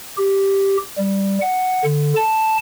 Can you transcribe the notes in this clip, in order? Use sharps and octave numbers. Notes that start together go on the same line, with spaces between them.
G4
G3
F#5
D3
A5